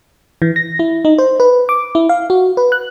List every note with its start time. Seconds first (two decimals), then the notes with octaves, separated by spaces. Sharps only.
0.42 E3
0.56 A#6
0.79 E4
1.05 D#4
1.18 C5
1.40 B4
1.69 D6
1.95 E4
2.09 F5
2.30 F#4
2.57 B4
2.72 F#6